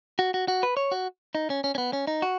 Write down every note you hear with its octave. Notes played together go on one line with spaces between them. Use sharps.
F#4
F#4
F#4
B4
C#5
F#4
D#4
C#4
C#4
C#4
B3
C#4
D#4
F#4